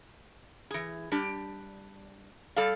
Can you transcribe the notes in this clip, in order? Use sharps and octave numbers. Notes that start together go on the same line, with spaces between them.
E3 G#4
G3 D4 G4
G3 A4 D5 F5